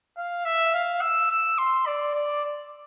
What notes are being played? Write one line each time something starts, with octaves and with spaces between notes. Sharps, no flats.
F5
E5
F5
E6
E6
C6
D5
D5